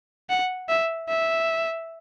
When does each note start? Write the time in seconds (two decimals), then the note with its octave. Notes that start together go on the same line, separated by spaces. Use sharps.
0.30 F#5
0.69 E5
1.09 E5